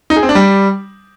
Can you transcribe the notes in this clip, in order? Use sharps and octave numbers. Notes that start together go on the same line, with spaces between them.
D#4
G#4
C4
D4
G3